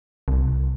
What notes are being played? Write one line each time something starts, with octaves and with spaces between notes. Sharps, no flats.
C2